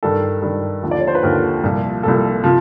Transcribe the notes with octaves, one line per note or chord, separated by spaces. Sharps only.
G2 D#3 A4
G2 D#3
D#2 D3 F3
D5
C#5
C5
B4
D#2 D3 F3 A#4
C2 A#2 F3
C2 A#2 F3 A4
C3 F3